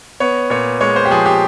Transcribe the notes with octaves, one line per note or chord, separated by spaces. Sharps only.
B3 C#5
A#2 C#5
G#3 C#5
C5
G4
F3 G#4
G4